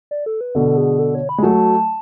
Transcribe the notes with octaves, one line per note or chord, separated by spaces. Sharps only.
D5
A4
B4
B2 D3 A4
G#4
A4
C#5
B5
G#3
F#3 A3 A5